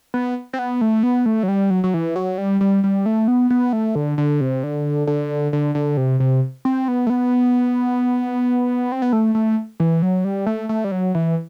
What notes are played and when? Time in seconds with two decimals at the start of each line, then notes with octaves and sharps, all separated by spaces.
0.14 B3
0.53 C4
0.59 B3
0.81 A3
1.03 B3
1.26 A3
1.43 F#3
1.48 G3
1.70 F#3
1.84 F#3
1.94 E3
2.16 F#3
2.38 G3
2.61 G3
2.84 G3
3.06 A3
3.28 B3
3.50 B3
3.73 A3
3.95 D3
4.18 D3
4.41 C3
4.63 D3
5.07 D3
5.53 D3
5.75 D3
5.97 C3
6.20 C3
6.65 C4
6.88 B3
7.07 A3
7.10 B3
8.92 C4
9.02 B3
9.13 A3
9.35 A3
9.80 E3
10.02 F#3
10.25 G3
10.46 A3
10.69 A3
10.84 G3
10.91 F#3
11.15 E3